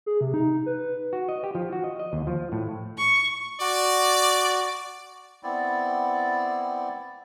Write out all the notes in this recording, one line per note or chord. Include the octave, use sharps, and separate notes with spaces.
G#4
C3
D#4
B4
F#4
D#5
G4
F3
F#4
D#5
D#5
D#2
F3
A2
C#6
F#4 D5
B3 C4 E4 D5